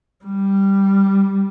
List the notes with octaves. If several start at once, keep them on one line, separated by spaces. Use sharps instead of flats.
G3